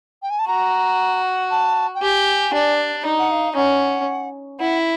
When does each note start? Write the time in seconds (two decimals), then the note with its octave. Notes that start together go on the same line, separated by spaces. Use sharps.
0.22 G5
0.30 G#5
0.39 A5
0.48 F#4 A#5
1.51 A5
1.95 G5
2.02 G4 G#5
2.54 D4
3.05 D#4
3.19 F#5
3.31 F5
3.56 C#4 F#5
4.59 E4 F#5